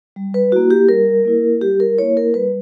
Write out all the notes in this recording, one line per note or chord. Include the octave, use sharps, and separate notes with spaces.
G3
B4
A#3 E4 F#4
G4
G3 A#4
A#3 E4
G3 G4
A#4
A#3 E4 C#5
A#4
G3 B4